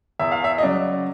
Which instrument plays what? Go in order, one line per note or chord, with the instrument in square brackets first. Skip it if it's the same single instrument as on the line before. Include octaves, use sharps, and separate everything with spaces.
[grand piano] E2 E5
F5
E5
D#5
C#3 F#3 D5